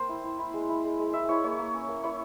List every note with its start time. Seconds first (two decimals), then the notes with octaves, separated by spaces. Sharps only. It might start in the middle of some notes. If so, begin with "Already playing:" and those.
Already playing: A#3 C4 A#4 C5
0.09 E4
0.24 E4
0.39 E4
0.54 G#3
0.69 E4
0.84 G#3
0.99 G#3
1.13 E4 E5
1.29 E4 C#5
1.43 A#3 C#5
1.59 A#3
1.74 C#4
1.89 A#3
2.04 E4 C#5